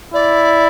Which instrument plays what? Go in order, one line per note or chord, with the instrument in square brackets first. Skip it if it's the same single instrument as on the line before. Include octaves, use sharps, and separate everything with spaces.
[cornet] E4 [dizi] D5